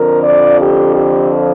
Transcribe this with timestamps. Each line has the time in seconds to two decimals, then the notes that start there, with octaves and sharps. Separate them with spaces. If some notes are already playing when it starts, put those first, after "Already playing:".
Already playing: F2 D3 F3 A#4
0.23 D5
0.60 G4
0.95 G4